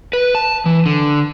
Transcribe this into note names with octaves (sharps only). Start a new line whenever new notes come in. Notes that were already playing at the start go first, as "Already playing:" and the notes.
B4
A5
E3
D3